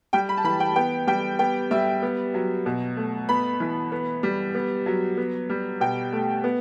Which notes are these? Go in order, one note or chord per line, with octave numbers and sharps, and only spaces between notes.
G3 G5
B5
A5
E3 B5
G5
B3 G5
G3 G5
B3 G5
G3 E5
B3
F#3
B2
A3
B3 B5
E3
B3
G3
B3
F#3
B3
G3
B2 G5
A3
B3